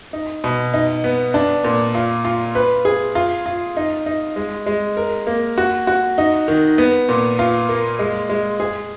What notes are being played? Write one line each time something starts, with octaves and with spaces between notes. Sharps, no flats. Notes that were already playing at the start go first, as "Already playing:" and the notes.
D#4
B2
D#4
B3
D4
A#2
F4
F4
B4
G#4
F4
F4
D#4
D#4
G#3
G#3
A#4
A#3
F#4
F#4
D#4
D#3
B3
A#2
F4
A#3
G#3
G#3
G#4